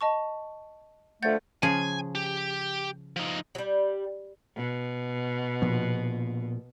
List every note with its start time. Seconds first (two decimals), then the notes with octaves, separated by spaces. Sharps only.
0.01 D#5 A5 C#6
1.22 D3 F3 A3 F#5 G6 A6
1.63 C#3 F3 G#4 G#5
2.15 G4
3.16 F3 D#4
3.55 F#3 G3
4.56 B2
5.62 A#2 F3 B3